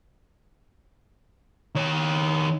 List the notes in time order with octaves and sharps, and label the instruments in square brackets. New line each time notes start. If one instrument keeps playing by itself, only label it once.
[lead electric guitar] D#3 C#5